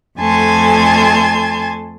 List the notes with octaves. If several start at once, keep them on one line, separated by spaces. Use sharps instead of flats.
F2 A3 G#5 A5 C6 G#6